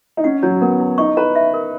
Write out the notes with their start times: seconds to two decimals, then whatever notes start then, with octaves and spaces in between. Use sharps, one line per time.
0.17 D#4
0.24 C#4 F#5
0.43 F#3 C#5
0.61 B3 A#4
0.80 E4
0.98 D#4 C#6
1.17 B4 A#5
1.35 E5
1.54 A#4